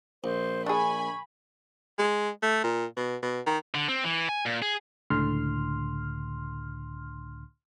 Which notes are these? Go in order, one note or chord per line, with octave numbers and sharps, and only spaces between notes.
A#1 C5
D4 G#4 G#5 B5 C#6
G#3
A3
A#2
B2
B2
D#3
D3
C4
E3
G#5
A#2
G#4
C#2 A2 D3 C6 F6